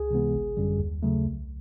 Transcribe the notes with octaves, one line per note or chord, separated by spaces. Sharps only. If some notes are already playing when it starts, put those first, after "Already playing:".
Already playing: C#2 G#4
C3 E3 G#3 B3
G#1
F#2 D3 G3
D#2
C#3 F#3 A3
C2